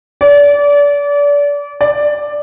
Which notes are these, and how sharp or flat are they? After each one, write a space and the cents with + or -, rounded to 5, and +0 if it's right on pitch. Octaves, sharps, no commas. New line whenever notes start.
D5 -30
D5 +10